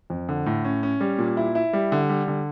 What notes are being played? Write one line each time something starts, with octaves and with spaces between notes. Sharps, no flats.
F2
D3
A2
C#4
C#4
G3
A#2
E4
E4
G3
D3
G3
D3